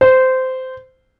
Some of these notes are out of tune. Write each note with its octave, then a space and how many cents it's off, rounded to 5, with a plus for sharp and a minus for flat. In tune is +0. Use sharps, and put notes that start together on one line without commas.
C5 -15